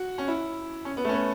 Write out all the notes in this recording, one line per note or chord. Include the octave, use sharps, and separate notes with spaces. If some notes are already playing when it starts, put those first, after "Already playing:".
Already playing: F#4
C#4
E4
C#4
B3
A3
C#4
B3